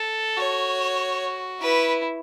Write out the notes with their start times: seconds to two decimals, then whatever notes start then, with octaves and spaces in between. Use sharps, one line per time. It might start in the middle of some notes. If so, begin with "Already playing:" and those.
Already playing: A4
0.38 F#4 C#5
1.61 E4 B4